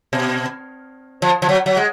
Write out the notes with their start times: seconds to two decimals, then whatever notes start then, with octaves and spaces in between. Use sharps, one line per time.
0.13 B2
1.22 F3
1.42 F3
1.49 F#3
1.66 F#3
1.77 G#3